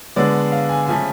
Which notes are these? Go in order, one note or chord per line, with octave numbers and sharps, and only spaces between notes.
D3 G#3 B3 D5
F5
G#5
C#3 F3 A3 G#5